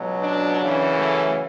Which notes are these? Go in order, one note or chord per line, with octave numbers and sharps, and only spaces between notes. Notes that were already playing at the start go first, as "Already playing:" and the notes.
Already playing: C#2 B2 F#3
D4
F#2 C#3 E3
A3